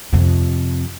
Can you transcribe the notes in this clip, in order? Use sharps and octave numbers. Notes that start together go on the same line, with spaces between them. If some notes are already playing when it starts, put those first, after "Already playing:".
F2 C3